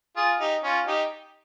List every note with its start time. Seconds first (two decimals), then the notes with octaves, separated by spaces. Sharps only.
0.16 F4 G#4
0.39 D#4 G4
0.63 C#4 F4
0.87 D#4 G4